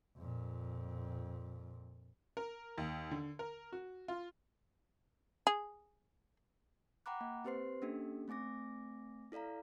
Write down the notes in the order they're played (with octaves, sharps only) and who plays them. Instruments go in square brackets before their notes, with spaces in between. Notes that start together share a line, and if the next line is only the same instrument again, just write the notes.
[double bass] F2 A#2
[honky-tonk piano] A#4
D#2
D3
A#4
F#4
F4
[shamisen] G#4
[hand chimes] F#5 G5 A#5 B5 D6 F#6
A#3
C4 G4 B4 C5 C6 C7
A#3 C#4 D4 G4 A4
A3 C4 G#5 D6 A#6
E4 A4 D5 F5 A#5